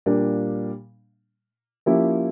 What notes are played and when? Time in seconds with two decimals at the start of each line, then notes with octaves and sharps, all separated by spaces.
0.06 A#2 G3 A#3 D4
1.86 F3 A#3 C#4 E4 G4